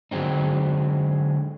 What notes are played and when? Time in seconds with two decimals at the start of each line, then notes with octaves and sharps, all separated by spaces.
0.11 D3 F#3 G#3 C4 D#4